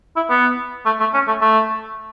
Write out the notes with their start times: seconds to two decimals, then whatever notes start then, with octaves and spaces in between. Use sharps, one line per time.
0.16 E4
0.30 B3
0.86 A3
1.00 A3
1.14 C#4
1.28 A3
1.41 A3